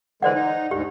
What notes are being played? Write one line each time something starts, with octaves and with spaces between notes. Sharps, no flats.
D3 E3 G#3 C5 D5 F#5
D#4
D2 G#2 G4